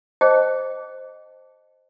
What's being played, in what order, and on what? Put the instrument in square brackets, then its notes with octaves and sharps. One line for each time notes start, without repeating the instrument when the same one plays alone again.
[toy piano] G#4 C5 D#5 G5 A5